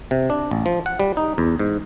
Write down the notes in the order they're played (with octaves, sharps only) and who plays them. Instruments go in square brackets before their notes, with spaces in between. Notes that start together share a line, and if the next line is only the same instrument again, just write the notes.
[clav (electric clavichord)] C3
D4
A1
F3
F#5
G3
D#4
E2
G#2